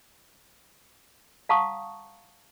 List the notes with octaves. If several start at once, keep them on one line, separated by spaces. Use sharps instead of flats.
F5 F#5 A5 A#5 C#6 D#6